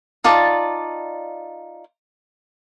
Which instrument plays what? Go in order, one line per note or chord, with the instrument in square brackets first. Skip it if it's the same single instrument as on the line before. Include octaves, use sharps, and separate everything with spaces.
[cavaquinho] D#4 F4 D5 A5